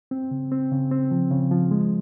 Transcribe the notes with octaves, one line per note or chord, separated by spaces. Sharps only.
C4
C#3
C4
C#3
C4
F3
C#3
F3
G#3